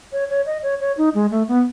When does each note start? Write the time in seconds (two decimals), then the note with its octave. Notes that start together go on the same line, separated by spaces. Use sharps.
0.12 C#5
0.30 C#5
0.46 D#5
0.63 C#5
0.80 C#5
0.98 D#4
1.15 G#3
1.31 A3
1.48 B3